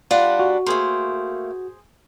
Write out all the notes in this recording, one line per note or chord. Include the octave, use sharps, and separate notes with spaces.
G3 D4 F4 F#5
F#4
A3 A#3 G#4 C5